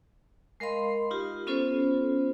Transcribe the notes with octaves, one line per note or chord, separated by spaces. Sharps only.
G#3 A#4 D#5 F5 B5 C6
D#4 F4 G4
B3 C#4 F4 A4 C5